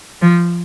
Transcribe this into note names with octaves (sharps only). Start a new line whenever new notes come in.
F3